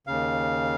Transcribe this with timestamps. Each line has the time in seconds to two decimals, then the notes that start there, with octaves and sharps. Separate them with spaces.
0.07 D#2 C#3 F5